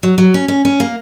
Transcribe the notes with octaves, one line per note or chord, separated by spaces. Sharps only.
F#3
F#3
C#4
C#4
C#4
A#3